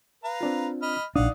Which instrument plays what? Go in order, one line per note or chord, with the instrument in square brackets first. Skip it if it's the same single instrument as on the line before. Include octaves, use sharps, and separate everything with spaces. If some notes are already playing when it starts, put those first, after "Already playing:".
[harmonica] B4 F5 A#5
[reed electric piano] C4 D4 F4
[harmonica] D#5 B5 F6
[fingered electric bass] A#1 D4 [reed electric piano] D#4 D5 D#6 [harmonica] F5 F#5